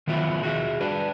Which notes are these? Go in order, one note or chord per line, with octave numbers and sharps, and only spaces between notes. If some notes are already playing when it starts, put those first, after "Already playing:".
D#3 F3 F#3 B3 E4 F4
F#4 G#4 E5
D4 B4